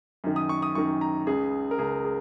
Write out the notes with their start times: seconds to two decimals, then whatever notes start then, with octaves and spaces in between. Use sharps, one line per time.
0.24 F#2 D#3
0.36 D#6
0.49 C#6
0.62 D#6
0.75 F#2 D#3 C#6
1.01 A#5
1.27 C#2 C#3 G#4
1.71 A#4
1.79 C#2 C#3 G#4
2.05 G#4